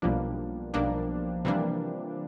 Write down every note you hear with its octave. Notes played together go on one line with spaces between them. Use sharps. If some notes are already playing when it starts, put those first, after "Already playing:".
B1 B2 F3 G3 A#3 D4
B1 B2 G3 A#3 D4
C3 E3 G3 A#3 D4